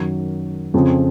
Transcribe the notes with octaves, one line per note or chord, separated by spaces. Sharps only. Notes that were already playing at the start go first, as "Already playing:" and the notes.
Already playing: F#2 D#3 F#3
F2 C#3 F3 C4